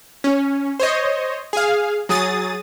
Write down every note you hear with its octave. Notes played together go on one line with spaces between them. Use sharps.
C#4
C5 C#5 D#5
G#4 F5
F#3 G#4 D#6 A6